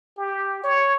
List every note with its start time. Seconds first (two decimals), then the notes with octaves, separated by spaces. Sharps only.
0.18 G4
0.64 C#5